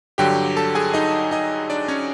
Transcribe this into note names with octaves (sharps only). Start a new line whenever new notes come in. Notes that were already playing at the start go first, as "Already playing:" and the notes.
G2 D3 F#3 G4 G5
A4 A5
G#4 G#5
D#4 D#5
D#4 D#5
D4 D5
C#4 C#5